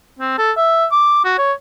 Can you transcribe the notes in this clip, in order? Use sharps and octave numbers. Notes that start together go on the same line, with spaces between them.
C4
A4
E5
D6
F#4
C#5